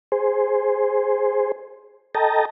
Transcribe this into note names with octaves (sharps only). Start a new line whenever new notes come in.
G#4 C5
A4 D#5 G5 A5 A#5